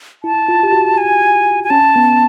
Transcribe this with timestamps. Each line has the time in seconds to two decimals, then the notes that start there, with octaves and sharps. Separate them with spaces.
0.23 E4 A5
0.49 F4
0.63 G4
0.73 F#4
0.98 G#5
1.64 G#5
1.70 C#4 A5
1.96 B3